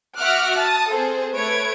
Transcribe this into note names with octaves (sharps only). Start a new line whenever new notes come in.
F#4 E5 F#5 D6 F6 F#6
A5 D#6
C4 G#4 A4 C5
A3 B4 C#5 G#6 D7